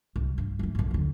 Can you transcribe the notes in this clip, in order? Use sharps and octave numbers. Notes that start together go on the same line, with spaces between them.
C2
G2
F#2 A2
B1 F#2
D#2 D3